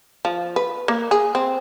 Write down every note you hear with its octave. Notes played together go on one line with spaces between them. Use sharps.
F3
B4
A#3
G#4
C4